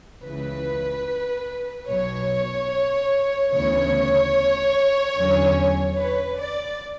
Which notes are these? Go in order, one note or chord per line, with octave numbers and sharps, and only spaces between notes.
C#2 C#3 E3 B4
B1 B2 F#3 C#5
D2 C#3 E3 B3 C#5
E2 D3 F#3 C#4
B4
D5